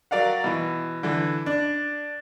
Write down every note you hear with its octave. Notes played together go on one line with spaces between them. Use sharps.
F#3 A#4 D5 F5 F#5
B2 E3
D3 E3
D4